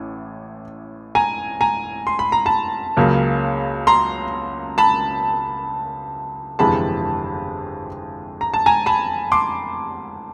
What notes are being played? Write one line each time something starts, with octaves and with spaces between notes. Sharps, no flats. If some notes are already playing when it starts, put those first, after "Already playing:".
Already playing: A1 A2
G#5 A#5
G#5 A#5
C6
B5
A#5
A5 B5
C#2 C#3 F#3 A#3
A#5 C6
A5 B5
G1 F2 C3 E3 G#3 A5 B5
A#5
A5
G#5 A#5
A5 B5
C6 D6